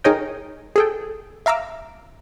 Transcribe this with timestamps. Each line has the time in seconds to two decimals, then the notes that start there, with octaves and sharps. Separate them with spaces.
0.04 D#4 G#4 A#4 C#5 D#5 G5
0.76 G#4 A4 G5
1.46 E5 F5 A#5 D6 E6